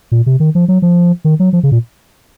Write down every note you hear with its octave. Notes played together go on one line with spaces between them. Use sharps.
A#2
C3
D#3
F3
F#3
F3
D#3
F#3
F3
C#3
A#2